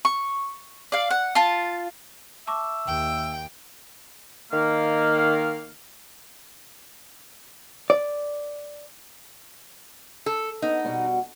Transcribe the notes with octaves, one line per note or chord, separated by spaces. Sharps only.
C#6
D5 F5
F#5
F4 A5
E5 A5 C#6 D6
D#2 G5
D#3 A#3 F5
D5
A4
B3 D#4
B2 G3 F#4